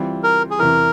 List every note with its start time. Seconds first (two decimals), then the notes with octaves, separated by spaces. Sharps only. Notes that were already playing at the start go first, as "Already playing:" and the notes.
Already playing: E3 G3 C4 F4
0.23 A#4
0.51 G#4
0.59 E2 C3 E3 A#4